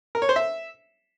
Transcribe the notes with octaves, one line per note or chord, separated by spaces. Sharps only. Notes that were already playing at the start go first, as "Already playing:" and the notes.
A#4
C#5
C5
E5